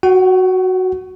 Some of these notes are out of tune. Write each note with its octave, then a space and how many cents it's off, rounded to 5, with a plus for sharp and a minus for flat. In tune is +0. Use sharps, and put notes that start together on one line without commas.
F#4 +0 F#5 +45